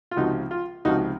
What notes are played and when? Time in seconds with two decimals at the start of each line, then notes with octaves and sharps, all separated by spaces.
0.11 F4
0.17 C#2 C3 F3 D#4 F#4
0.51 F4
0.85 C#2 C3 F3 D#4 F#4